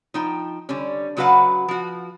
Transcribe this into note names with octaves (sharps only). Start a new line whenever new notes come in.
F3 D#4 G5
D3 G3 C#4
C#3 F#3 F#4 B4 F5 F#5
F3 F#4